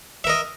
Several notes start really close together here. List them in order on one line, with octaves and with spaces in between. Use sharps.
E5 A#4 D#5